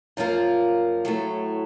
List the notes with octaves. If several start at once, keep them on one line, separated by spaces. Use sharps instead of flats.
F#2 F3 A#3 F4 A#4
A2 F#3 A3